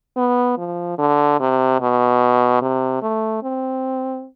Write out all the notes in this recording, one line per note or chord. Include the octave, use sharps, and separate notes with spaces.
B3
F3
D3
C3
B2
C3
A3
C4